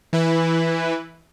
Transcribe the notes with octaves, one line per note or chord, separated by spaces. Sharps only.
E3 E4 B4